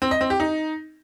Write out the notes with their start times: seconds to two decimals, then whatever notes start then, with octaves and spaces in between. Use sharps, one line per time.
0.02 C4
0.11 D#5
0.21 C4
0.30 G4
0.40 D#4